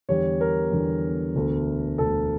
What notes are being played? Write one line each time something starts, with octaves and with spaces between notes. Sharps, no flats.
E2 D3 G3 C#5
A#4
E2 D3 G3
E1 D2 D3 A3
E1 D2 D3 A3 A4